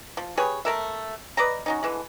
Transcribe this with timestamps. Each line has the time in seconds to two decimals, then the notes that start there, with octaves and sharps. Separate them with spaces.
0.17 F3
0.37 G4 G#4 B4 C#5
0.65 A3 A#4 E5
1.37 B4 D5 D#5 A#5
1.66 F#3 C#4 D#4
1.83 D3 E3 G#3